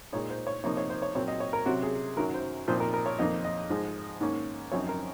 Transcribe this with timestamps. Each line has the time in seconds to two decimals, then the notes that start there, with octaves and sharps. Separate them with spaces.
0.12 A#2 G#3 D#4 C#5
0.30 C5
0.47 C#5
0.64 C3 F3 A#3 D#4 C#5
0.77 C#5
0.90 C5
1.02 C#5
1.15 A#2 F#3 C4 C#5
1.28 D#5
1.40 C#5
1.53 A#4
1.66 C3 F#3 C#4 F#4
1.83 G#4
2.17 F#2 D#3 F#3 A#4
2.34 C5
2.68 A#2 F3 C4 D#4 C5
2.80 A#4
2.94 A#4
3.06 C#5
3.19 F2 D#3 A#3 D#4 D#5
3.44 D#5
3.70 G#2 F3 G#3
4.21 G#2 D#3 A#3 C#4
4.72 F#2 F3 C4 D#4 C#5
4.89 A#4